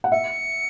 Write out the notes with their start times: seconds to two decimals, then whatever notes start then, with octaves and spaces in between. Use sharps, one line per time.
0.04 F#5
0.12 E5 C#7